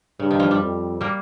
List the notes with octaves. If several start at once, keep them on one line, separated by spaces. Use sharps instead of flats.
G2 C#3
D#3
F3
G3
F2
G3 A#3